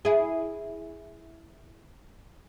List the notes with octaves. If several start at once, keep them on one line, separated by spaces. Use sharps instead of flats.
E4 G#4